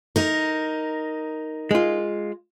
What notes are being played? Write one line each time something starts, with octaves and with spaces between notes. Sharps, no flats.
D#4 A#4
G#3 F4